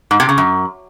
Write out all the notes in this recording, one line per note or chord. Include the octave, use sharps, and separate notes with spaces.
G#2
C3
C#3
F#2